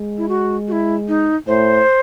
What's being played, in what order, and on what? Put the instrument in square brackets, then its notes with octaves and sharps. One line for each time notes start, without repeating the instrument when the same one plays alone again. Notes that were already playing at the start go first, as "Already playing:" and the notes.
Already playing: [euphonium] G#3
[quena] E4
F#4
F#4
E4
D#4
[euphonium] A2 [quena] C5